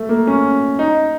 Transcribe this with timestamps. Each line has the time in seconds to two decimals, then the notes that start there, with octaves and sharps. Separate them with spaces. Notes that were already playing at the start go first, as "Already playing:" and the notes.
Already playing: A3
0.09 A#3
0.27 C#4
0.79 D#4